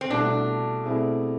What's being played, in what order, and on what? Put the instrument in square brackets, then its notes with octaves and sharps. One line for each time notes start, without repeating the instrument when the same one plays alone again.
[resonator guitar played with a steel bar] C4
[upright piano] C2 B2 A3 [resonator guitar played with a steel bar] D4
[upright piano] B2 A3 C4 E4 G#4